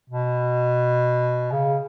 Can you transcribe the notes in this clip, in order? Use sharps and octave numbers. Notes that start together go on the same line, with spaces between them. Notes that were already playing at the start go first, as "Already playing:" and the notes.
B2
C#3